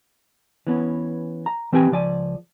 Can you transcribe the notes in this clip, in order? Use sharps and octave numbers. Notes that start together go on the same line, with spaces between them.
E3 B3 C#4
A#5
E3 C4 G4 B4 G5 G#5
C#2 F3 D5 G#5